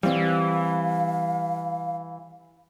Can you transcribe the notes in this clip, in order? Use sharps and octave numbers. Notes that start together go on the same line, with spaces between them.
E3 G3 C4 F5